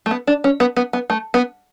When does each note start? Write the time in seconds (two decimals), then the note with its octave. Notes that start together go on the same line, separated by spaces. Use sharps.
0.06 A3
0.11 B3
0.27 D4
0.44 C#4
0.60 B3
0.76 B3
0.93 B3
1.10 A3
1.34 B3